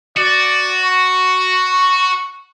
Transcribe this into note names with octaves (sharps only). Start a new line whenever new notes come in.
F#4 D5
C#6